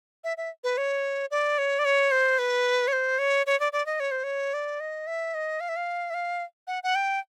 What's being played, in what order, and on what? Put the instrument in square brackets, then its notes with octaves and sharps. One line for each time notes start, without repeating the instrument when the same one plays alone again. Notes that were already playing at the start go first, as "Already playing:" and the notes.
[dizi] E5
E5
B4
C#5
D5
C#5
D5
C#5
C5
B4
C#5
C5
C#5
C#5
D5
D5
D#5
C#5
C5
C#5
D5
D#5
E5
D#5
F5
E5
F5
E5
F5
F#5
F#5
G5